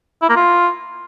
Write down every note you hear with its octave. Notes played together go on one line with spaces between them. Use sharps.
E4
A#3
F4